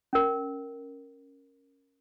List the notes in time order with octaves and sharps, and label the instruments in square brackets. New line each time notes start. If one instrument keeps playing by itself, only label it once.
[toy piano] C#4 A#4